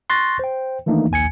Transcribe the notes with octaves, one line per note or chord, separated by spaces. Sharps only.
C6 C#6 F#6 A6 A#6
C5 G5
D#3 E3 A3 A#3 D4 D#4
A#1 D#2 G#5 G#6 C#7